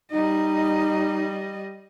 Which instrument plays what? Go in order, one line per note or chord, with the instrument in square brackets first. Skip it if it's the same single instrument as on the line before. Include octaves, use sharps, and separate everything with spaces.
[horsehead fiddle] G3 D#5 [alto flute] D#4